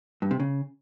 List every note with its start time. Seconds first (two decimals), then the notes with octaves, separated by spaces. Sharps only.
0.22 G2
0.31 C3
0.40 C#3